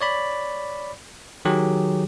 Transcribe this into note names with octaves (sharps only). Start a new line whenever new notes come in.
C#5 D5 B5
D#3 F#3 G4 G#4